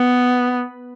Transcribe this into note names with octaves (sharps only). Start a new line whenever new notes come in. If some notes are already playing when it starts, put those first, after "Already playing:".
Already playing: B3